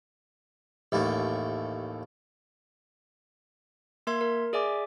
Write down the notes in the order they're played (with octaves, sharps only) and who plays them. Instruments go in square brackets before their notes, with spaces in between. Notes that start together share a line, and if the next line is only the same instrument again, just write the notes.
[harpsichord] A1 D#2 A3
[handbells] A#3 A#4 E5 C6 G#6
A#4
G#4 D5 E5 G#5 D6